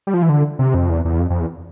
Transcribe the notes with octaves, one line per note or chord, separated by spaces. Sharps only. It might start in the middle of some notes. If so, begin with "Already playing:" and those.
G3
F3
E3
D3
C3
F2
E2
E2
F2
F2
E2